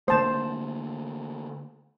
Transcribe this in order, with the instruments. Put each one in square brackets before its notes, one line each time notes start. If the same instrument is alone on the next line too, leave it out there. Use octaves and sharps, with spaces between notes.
[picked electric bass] D3 A3 A#3 [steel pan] C5 A5